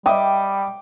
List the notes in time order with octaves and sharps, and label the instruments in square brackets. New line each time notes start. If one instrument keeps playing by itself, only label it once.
[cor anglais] G3 [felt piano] D#5 E5 D#6 [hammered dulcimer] G5 D6